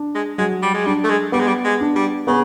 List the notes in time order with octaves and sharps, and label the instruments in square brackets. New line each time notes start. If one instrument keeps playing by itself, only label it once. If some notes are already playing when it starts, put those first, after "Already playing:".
Already playing: [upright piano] D4
[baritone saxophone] G#3
[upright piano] F#3 [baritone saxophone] G#3
[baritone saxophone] G3
G#3
[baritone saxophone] G3 [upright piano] D4
[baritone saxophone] A3
G#3
[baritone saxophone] G3 [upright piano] B3
[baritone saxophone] G#3
G3
G#3
[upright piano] D4
[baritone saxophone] G3
[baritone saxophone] C#3 [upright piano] B3